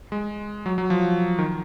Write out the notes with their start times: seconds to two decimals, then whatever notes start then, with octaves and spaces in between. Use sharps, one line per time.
0.12 G#3
0.66 F#3
0.78 F#3
0.90 F3
1.39 D#3